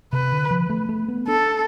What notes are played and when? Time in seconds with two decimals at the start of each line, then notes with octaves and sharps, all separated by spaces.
0.13 C3 B4
0.32 D3
0.51 F3
0.69 A3
0.89 A3
1.08 B3
1.28 D4 A4